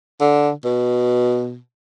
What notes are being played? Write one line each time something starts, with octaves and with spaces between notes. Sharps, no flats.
D3
B2